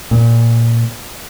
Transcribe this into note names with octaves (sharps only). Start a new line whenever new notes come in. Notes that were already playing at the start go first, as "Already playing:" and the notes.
A#2